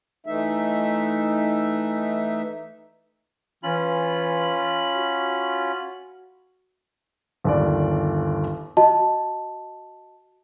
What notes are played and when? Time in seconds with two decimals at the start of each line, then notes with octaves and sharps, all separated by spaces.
0.26 E3 A3 D#4 E5
3.63 E3 C#4 F4 B5
4.95 F#4
7.44 G1 D#2 D5
8.77 F#4 D#5 A5